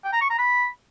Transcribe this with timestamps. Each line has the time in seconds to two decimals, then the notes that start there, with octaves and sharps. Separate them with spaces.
0.04 G5
0.13 A#5
0.21 C#6
0.30 A#5
0.38 B5